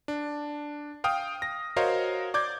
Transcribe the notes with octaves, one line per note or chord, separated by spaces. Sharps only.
D4
F5 G5 D#6 F6
A#6
F#4 A#4 C5 C#5 D#5 F5
D5 D6 G6 G#6